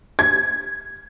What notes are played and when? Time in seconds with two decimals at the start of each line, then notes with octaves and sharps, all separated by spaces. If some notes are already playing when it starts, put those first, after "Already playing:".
0.19 G#6